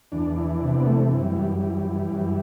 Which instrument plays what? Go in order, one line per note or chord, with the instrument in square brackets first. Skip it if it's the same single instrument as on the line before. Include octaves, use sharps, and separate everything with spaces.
[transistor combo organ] E2 D4
E3
C3
B3
E3 A3
F#2
G3
F#2 G3
E3
E3
F#2